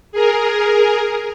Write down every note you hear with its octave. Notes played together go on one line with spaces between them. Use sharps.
G#4 A#4